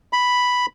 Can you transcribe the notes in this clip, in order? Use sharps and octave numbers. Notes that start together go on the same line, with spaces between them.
B5